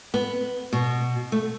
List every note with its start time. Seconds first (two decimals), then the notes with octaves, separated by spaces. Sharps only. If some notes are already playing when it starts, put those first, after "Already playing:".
0.14 B3
0.73 B2
1.32 A3